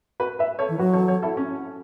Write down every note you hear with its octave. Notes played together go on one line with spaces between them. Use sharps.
F#4 B4
B4 E5
A4 C#5
E3
F#3 F#4 B4
A4 C#5
A4 C#5
E4 A4
C#4 F#4